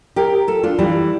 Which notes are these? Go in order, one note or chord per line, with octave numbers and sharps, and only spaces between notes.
G4 A#4
F4 A4
D4 F4
E3 G3